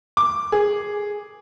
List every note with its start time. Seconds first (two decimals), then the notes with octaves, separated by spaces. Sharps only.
0.17 D6
0.52 G#4